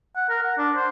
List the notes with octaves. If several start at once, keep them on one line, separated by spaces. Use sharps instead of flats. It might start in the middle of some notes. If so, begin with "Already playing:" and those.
F#5
A#4
F#5
D4
C5